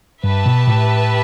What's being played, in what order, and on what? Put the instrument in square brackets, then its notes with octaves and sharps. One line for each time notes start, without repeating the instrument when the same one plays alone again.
[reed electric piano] G2 [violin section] G4 B4 E5 A5
[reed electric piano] B2
A2